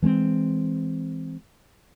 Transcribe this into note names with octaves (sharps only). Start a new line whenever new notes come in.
E3 G#3 A3 C4